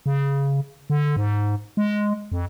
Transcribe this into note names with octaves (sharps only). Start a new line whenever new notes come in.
C#3
D3
G#2
G#3
F2